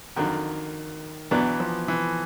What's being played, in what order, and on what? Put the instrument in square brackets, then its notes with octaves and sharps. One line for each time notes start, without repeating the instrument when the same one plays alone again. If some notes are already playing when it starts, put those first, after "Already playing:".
[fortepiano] F2 D3 F#3 [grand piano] D#3
[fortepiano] E2 B2 F#3 B3 D4 [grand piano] E3
[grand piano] F3
E3